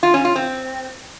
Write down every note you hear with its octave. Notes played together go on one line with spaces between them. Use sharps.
F4
C#4
F4
C4